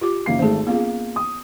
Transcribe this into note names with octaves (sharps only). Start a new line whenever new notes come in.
F4 G4 D6
F#1 A#3 C7
G#1 A3 G#4 C5
A#3 B3 C#4 F4 G#4
D#6